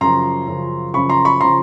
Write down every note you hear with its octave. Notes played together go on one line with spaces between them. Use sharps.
F#2 C#3 F3 A#5 C6
F#2 C#3 F3
F#2 C#3 F3 B5 C#6
A#5 C6
B5 C#6
C#3 F3 A#5 C6